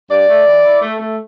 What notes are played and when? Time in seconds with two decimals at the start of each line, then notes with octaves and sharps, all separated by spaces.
0.10 G2 D5
0.28 A3
0.47 E3
0.64 E4
0.82 A3
1.00 A3